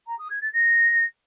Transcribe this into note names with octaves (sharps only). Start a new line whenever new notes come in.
A#5
D#6
G#6
A6
A#6